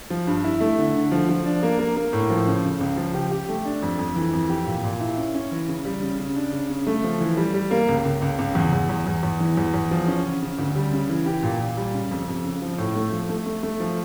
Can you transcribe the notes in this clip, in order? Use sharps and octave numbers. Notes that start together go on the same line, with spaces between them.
F3
G2
E4
A3
D3
D3
F3
F3
D4
A#3
A#3
A#3
A2
F3
C#3
C#3
C#2
F3
G4
G4
A3
D4
F2
F2
E3
F2
G4
A#2
A#2
E4
C#4
C#4
E3
C#3
G3
C#3
C#3
D4
C#3
C#3
A3
F3
E3
G3
G3
A#3
C#2
C#2
C#2
C#2
E2
E2
E2
E2
E2
E3
E2
E2
F3
C#4
C#3
C#3
D2
G3
C#3
E3
G4
A#2
A#2
G3
C#3
F2
F2
C#3
F3
A2
A3
F3
A3
A3
A3
F3